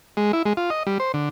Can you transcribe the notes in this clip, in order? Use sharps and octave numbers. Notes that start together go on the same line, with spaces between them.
G#3
E4
G#3
F4
D#5
G3
C5
D3